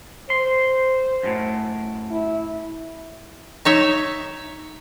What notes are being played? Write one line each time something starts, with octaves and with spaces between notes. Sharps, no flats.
C5 C6
F#2 A2
E4
D#4 C#5 E5